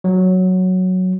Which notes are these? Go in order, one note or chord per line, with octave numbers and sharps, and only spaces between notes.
F#3